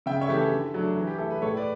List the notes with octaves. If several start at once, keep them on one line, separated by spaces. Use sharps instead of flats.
C#3 E5 G5
C#5 E5
E3 A3 G4
A4
D3
F#3 A3 D4
E3
G4
A3 E4 A4
B4
A2 A4 C#5
B4 D5